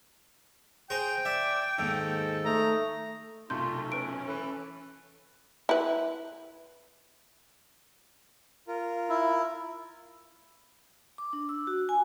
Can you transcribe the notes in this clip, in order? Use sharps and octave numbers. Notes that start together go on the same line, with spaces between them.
G#4 C5 G5 A#5
D5 E5
D#2 G#2 A4
A3 D#4 A#5
B1 F#2 C3 A3 F4 C6 G6
C#4 B4 C#6 D7
E3 A4
E4 B4
F4 A#4
E4
D6
D4
E6
F#4
G#5